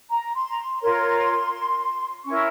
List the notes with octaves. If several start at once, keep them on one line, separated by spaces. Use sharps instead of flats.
A#5
C6
A#5
C6
F4 A#4 C#5 C6
C#4 E4 A#4 C#6